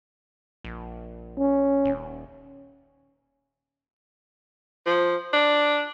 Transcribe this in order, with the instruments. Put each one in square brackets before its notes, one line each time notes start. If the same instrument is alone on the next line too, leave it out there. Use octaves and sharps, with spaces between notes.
[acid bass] A#1
[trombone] C#4
[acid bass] D#1
[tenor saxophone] F3
D4